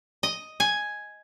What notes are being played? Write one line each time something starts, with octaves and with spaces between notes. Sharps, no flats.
D#5
G#5